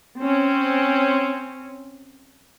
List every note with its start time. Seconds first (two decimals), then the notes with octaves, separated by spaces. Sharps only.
0.21 C4 C#4